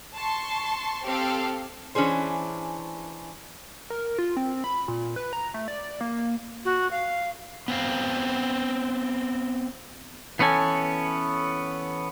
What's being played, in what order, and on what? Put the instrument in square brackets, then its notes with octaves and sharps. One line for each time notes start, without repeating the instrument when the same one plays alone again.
[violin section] A5 C6 C#6
C4 G4 A4 F5
[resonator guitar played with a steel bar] E3 C#4 D4 G#4 C5
[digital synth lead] A#4
F4
C4
B5
A#2
B4
A#5
A3
D5
A#3
[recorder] F#4
F5
[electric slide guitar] B3 C4 F5
[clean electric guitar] E3 B3 C#4 A4 G#5